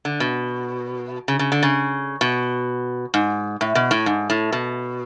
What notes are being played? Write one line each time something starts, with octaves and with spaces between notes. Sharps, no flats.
D3
B2
C#3
C#3
D3
C#3
B2
G#2
A2
B2
A2
G#2
A2
B2